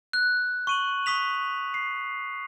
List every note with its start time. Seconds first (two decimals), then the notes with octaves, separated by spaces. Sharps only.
0.13 F#6
0.67 C#6 D#7 F#7
1.06 C#6 D#6 B6 F7
1.74 C7